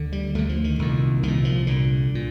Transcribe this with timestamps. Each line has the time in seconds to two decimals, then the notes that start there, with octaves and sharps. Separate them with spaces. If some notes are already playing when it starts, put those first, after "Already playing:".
Already playing: D2 D3
0.12 G3
0.35 D2 D3 A3
0.49 F3
0.64 D#3
0.79 C2 A#2
1.23 C2 A#2 D#3
1.45 F3
1.67 C2 A#2 D3
2.15 A#2